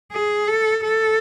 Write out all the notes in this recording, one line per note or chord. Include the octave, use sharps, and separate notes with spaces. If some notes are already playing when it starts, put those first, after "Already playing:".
G#4
A4
A4